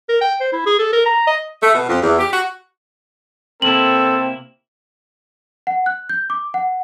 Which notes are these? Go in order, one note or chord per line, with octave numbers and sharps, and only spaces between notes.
A#4
G5
C5
E4
G#4
A4
A#4
A#5
D#5
A3
B2
F2
E2
G4
F#4
C3 A#3 C4 E4 A4 F#7
F#5
F#6
G6
D6
F#5